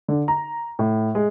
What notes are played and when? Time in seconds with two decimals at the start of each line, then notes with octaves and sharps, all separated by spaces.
0.08 D3
0.28 A#5
0.79 A2
1.15 G#3